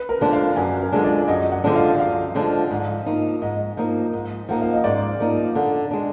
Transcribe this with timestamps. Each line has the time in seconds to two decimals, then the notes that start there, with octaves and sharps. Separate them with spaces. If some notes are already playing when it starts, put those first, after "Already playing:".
Already playing: B4
0.09 A#4
0.21 D3 F3 G#3 D4
0.33 F5
0.56 F#2 G#5
0.81 A#4
0.92 D3 F3 G#3 D4
1.05 D5
1.28 F#2 D#5
1.52 F#5
1.64 D3 F3 G#3 D4
1.76 F5
1.99 F#2 F5
2.35 D3 F3 G#3 D4
2.71 G#2
3.06 F3 A#3 D#4
3.42 G#2 D#5
3.77 F3 A#3 D#4
4.13 G#2
4.49 F3 A#3 D#4 F#5
4.62 F5
4.74 D#5
4.84 G#2 D5
5.20 F3 A#3 D#4
5.55 D3
5.91 G#3 D4